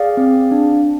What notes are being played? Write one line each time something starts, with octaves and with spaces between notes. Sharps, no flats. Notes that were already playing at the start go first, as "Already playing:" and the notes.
Already playing: G#4 D5 F5
C4
D4